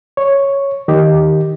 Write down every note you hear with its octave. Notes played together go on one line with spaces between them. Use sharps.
C#5
D#3 D#4 G4